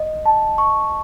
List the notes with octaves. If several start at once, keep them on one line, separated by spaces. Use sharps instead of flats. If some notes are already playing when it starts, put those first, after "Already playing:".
Already playing: D#5
A5
C#6